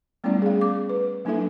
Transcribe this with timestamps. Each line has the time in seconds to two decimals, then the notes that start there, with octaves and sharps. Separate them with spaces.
0.24 G3 A3 B3 C#4 E4 D5
0.42 G#4 F5
0.57 B3 D6
0.89 B4
1.25 F#3 A#3 D4 E4 A4 E5